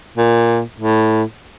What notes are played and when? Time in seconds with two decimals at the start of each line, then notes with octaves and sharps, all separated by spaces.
0.17 A#2
0.80 A2